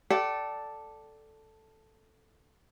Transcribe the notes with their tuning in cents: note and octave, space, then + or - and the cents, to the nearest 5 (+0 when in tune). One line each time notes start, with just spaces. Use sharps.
A4 +0 D5 +0 G5 -40